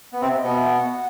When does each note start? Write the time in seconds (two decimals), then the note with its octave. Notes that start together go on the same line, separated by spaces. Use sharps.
0.12 B3
0.21 C3 C4 E5
0.37 D#5
0.44 B2 B3
0.52 E5
0.66 F#5